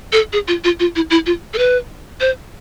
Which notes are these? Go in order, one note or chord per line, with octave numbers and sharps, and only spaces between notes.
A4
G#4
F4
F4
F4
E4
E4
F4
A4
B4
C5